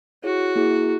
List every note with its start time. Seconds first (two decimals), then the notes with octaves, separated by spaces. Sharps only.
0.24 E4 F#4 G#4 C#5
0.56 A#3 E4 G#4